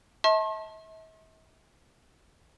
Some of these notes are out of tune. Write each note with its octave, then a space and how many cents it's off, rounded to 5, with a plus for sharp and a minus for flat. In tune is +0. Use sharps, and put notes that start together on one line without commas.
E5 -45 A5 +0 C6 +45